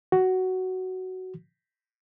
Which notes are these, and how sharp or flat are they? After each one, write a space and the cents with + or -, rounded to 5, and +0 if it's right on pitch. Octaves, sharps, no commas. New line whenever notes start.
F#4 +10